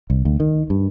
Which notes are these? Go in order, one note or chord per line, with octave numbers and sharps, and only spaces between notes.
C2
D2
D#3
G2